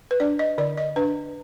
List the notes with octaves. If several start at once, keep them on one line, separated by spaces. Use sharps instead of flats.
B4
D4 D5
D#5
D3 D5
D#5
D4 B4